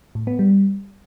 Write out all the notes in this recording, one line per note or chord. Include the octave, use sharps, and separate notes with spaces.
A2
B3
G3